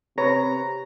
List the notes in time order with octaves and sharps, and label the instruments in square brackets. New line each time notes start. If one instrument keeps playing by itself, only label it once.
[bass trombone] C3 [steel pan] B4 C#5 [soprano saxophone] A#5